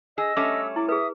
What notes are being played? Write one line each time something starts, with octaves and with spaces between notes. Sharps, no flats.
G#4 D#5 E6
G3 A3 C#4 D6
E4 D6
G#4 B4 E5 D#6